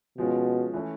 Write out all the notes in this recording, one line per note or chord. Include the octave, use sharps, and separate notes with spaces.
B2 F3 G#3 C#4 F4
E3 A3 C#4